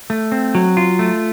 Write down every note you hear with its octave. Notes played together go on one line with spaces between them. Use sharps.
A3
C4
F#3
F4
A3